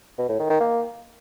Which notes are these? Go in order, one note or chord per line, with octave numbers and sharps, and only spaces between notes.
B2
A2
D#3
D#3
A#3